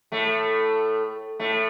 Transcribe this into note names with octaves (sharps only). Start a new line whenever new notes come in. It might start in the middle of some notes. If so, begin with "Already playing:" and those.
A2 A3
A2 A3